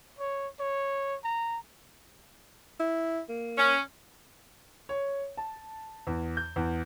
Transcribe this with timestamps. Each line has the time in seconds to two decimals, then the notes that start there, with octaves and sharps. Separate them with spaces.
0.19 C#5
0.60 C#5
1.24 A#5
2.80 E4
3.29 A#3
3.58 C#4
4.89 C#5
5.37 A5
6.07 E2
6.37 G6
6.56 E2